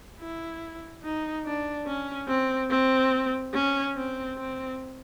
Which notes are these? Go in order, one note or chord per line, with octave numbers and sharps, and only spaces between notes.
E4
D#4
D4
C#4
C4
C4
C#4
C4
C4